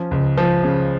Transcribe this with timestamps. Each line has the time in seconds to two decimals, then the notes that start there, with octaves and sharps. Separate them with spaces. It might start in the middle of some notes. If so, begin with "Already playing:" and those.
Already playing: F3 C#4
0.11 C#2
0.38 F3
0.64 C#3